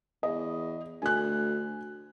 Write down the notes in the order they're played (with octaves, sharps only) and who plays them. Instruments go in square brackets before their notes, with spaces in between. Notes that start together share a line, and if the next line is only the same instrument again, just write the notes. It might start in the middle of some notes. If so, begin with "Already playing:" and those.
[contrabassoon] E2 [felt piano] D#5
[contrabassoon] D2 [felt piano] G#5 F#6